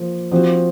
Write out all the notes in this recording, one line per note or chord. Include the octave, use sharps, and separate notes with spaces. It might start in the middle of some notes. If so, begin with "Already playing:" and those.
Already playing: F3 A#3
F3 C4 F#4